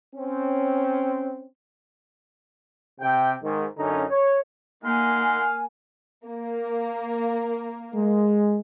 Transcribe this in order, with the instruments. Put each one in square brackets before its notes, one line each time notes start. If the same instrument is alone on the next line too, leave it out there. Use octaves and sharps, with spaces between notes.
[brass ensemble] C4 C#4
C3 G5
G#2 D#3
F#2 D3 C#4 D#4 A#5
C#5
[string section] A#3 [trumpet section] D#4 F#5 C6 [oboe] F5 [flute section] G#5
[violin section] A#3
[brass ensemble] G#3